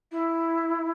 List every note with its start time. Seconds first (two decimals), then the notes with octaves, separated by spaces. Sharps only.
0.11 E4